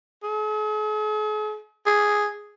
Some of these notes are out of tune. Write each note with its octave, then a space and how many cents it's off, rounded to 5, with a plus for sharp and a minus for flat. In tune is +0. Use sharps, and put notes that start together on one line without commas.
G#4 +45
G#4 +0